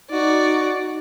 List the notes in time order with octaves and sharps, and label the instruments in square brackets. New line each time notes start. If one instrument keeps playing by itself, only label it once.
[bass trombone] D#4 [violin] F#4 D5